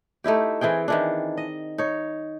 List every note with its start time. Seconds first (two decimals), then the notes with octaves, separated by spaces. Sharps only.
0.24 A3 D#4 E4 G4
0.61 E3 C4 G#4 G5
0.88 D#3 E3 D4
1.37 D#5
1.78 D#4 C#5